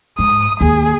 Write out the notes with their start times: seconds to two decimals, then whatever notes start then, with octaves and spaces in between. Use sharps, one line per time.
0.19 G#2 D#6
0.61 D#2 G#4